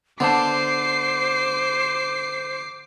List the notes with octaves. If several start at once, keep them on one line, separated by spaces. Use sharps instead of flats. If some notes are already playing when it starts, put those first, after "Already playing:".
D3 B3 C5 A5 D6 C7